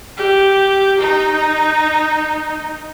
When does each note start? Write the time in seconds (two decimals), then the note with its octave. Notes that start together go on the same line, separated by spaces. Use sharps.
0.17 G4
1.00 D#4